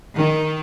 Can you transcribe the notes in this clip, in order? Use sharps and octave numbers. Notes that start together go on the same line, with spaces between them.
D#3